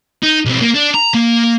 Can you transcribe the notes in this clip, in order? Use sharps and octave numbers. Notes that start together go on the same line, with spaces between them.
D#4
B1 C4
A#3
D4
A#5
A#3